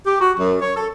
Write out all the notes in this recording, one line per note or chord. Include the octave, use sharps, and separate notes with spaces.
G4
F#4
F#2
C#5
A4